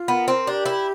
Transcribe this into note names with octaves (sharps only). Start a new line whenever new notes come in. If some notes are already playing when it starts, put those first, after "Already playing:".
Already playing: F4
B3 A#4
C4
D4 G4
E4